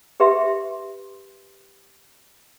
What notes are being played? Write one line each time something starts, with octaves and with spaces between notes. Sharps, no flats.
G4 B4 E5 C6